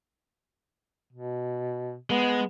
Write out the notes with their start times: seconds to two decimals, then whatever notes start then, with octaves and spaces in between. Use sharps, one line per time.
1.13 B2
2.10 G#3 B3